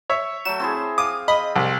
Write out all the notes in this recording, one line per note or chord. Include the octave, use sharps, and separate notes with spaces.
C#5 E5
F#3 A3 E7
C4 E4 G#4
F5 D6 D#6
D#5 B5
C2